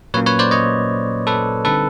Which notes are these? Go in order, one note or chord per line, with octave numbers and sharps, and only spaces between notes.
A#2 F#3 A#3 C#4 B4 C#5
B4 C#5
C5 D5
C#5 D#5
A4 B4
D3 G3 C4 D#4 A4 B4